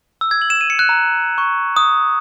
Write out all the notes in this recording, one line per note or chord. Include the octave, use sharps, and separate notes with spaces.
E6
G#6
F#7
E7
D#7
C#7
F#6
A#5
C#6
D#6